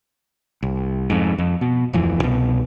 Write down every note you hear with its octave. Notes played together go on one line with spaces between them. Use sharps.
C2
F2 G#2
F2
B2
D1 F2 E3
C2 B2